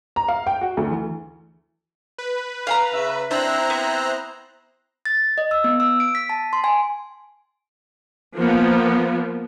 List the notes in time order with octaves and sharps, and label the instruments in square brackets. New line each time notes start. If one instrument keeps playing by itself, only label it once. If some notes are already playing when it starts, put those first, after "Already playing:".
[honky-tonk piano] A#5
F5
G5
F#4
D2
E3
[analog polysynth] B4
[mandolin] F5 G5 A#5
[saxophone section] C#3 E5
[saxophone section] C4 E4 E5 [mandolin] D4 [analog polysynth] C5 A#5 F#6
[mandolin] B3
[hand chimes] A6
D#5
E6
B3
E6
D7
B6
A5
C6
G#5
[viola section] F3 A#3 B3